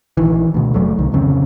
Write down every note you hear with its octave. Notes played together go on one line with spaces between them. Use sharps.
A#1 D#3 E3
D2 B2
F#1 G2 F#3 A3
C2 D#3
D1 F2 C#3 C4